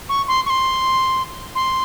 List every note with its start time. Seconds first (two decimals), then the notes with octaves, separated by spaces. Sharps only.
0.09 C#6
0.28 C6
0.46 C#6
0.50 C6
1.55 C6